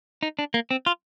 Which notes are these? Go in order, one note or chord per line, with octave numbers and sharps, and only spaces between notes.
D#4
D4
A#3
C4
F4